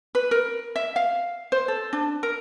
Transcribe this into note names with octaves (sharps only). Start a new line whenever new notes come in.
B4
A#4
E5
F5
C5
A4
D4
A#4